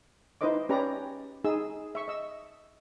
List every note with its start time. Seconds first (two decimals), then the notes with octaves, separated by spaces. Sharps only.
0.41 D#4 E4 B4 C5 D#5 D6
0.69 C#4 G4 B4 D5 A#5
1.44 D#4 G#4 E6
1.95 E5 C#6
2.08 D#5 E6